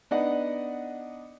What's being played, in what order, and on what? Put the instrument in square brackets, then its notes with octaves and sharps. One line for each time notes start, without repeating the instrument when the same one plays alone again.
[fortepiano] B3 D4 D#4 D5 D#5 F#5